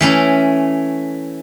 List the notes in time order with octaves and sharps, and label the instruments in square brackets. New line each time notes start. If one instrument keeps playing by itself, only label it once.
[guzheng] E3 A3 C#4 E4